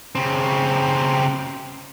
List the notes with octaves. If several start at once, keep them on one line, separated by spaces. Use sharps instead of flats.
C#3 C4